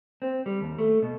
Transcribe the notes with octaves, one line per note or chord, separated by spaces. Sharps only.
C4
G3
D#2
A3
B2